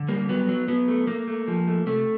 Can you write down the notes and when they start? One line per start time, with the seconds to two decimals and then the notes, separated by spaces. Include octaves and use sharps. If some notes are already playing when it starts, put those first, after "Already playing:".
Already playing: D3
0.08 G3 A#3
0.29 F#3 B3
0.49 F#3
0.68 F#3 B3
0.88 A3
1.07 A3 A#3
1.28 A3
1.48 F3
1.67 A3
1.87 C3 A3